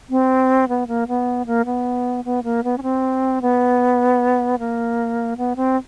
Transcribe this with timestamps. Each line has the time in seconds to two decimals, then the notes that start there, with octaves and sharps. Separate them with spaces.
0.10 C4
0.68 B3
0.88 A#3
1.08 B3
1.46 A#3
1.65 B3
2.25 B3
2.44 A#3
2.64 B3
2.78 C#4
2.83 C4
3.42 B3
4.59 A#3
5.37 B3
5.56 C4